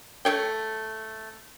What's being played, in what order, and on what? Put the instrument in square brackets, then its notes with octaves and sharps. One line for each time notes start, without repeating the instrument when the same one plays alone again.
[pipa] A3 C#5 G5